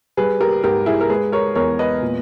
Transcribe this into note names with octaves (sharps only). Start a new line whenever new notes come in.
G3 G#4 B4
G4 A#4
G#2 G4 A#4
E4 G#4
A#4
G#3 G#4 B4
A#4 C#5
E2 A#4 C#5
B4 D#5
A#2